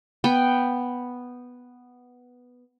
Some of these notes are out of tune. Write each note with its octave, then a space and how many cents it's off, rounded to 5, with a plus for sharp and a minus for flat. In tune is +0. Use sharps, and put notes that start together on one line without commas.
B3 +0 G5 +0